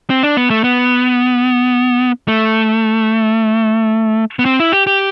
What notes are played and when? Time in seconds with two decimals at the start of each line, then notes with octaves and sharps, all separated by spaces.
0.10 C4
0.23 D4
0.37 B3
0.50 A3
0.64 B3
2.28 A3
4.39 B3
4.45 C4
4.60 E4
4.72 G4
4.87 G4